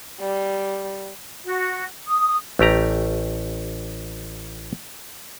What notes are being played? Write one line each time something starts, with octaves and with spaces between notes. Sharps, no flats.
G3
F#4
D#6
A1 A3 G4 A#5